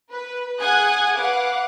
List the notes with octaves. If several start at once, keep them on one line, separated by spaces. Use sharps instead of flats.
B4
G#4 F#5 G#5 D#6 F#6 G#6
B4 F5 F#5 D6